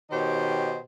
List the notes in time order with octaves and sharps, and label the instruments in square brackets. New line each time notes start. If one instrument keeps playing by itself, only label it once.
[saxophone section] B2 D#3 G4 C5 C#5 D#5